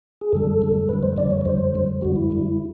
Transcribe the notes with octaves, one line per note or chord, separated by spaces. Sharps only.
G#4
F#2 D3 G3 A4
F#2 D3 G3
F#2 D3 G3 B4
C5
F#2 D3 G3 D5
C#5
C#5
F2 D3 G3 C5
F2 D3 G3
F2 D3 G3 F#4
E4
F2 D3 G3